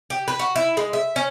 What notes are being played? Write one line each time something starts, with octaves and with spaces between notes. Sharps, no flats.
G4
B4
F#4
E4
G#3
E5
C#4